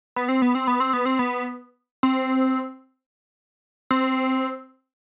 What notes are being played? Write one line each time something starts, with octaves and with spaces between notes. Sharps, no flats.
B3
C4
B3
C4
B3
C4
B3
C4
B3
C4
C4